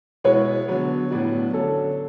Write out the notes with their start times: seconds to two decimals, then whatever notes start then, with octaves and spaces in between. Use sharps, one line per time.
0.24 B2 G#3 B3 E4 C#5
0.68 D3 F#3 B3
1.10 A2 F#3 B3 D4 F#4
1.53 D3 F#3 C#4 A4